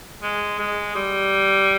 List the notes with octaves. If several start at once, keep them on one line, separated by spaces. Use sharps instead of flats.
G#3
G#3
G3